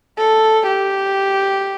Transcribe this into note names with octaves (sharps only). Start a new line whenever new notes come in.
A4
G4